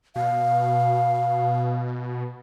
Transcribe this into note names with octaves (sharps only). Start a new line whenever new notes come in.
B2 F5